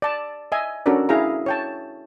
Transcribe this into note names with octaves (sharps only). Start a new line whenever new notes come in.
D5 A5
D#5 E5 G#5
C#4 D4 F#4 A4 A#4 D5
E4 G#4 F5 A#5
C#5 G5 A5